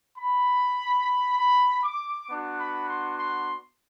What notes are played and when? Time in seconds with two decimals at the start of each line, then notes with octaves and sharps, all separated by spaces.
0.19 B5
1.39 B5
1.84 D6
2.29 B3 D4 F#4
2.60 B5
2.89 C6
3.19 C6